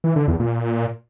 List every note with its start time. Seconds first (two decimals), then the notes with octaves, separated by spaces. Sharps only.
0.04 E3
0.16 D3
0.28 E2
0.40 A#2